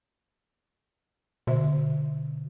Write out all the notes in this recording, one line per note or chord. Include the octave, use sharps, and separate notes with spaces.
B2 D3 C5 E5